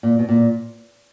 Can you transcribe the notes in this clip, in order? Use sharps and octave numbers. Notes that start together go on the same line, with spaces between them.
A#2
B2
A#2